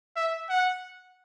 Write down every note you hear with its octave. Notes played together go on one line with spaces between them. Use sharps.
E5
F#5